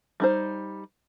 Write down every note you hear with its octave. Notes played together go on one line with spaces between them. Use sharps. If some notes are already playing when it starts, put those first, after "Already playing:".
G3 D#4 C5